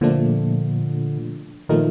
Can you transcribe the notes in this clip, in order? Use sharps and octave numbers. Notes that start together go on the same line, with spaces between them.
A#2 D3 F3 A3 D4
A#2 D#3 F3 A3 D#4 A#4